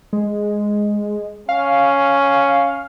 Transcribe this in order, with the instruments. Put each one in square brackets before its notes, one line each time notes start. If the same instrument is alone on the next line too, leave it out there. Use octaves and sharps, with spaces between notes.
[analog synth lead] G#3
[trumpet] C#4 [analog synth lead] F5